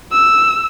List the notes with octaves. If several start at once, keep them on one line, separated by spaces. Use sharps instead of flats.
E6